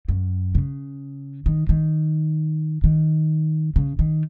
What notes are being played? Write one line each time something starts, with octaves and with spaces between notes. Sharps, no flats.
F#2
C#3
D#3
D#3
D#3
C#3
D#3